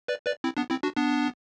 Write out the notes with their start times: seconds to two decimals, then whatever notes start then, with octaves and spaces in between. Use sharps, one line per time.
0.08 B4 D5
0.26 B4 D5
0.44 C4 E4
0.57 B3 D4
0.70 C4 E4
0.83 D4 F#4
0.96 B3 D4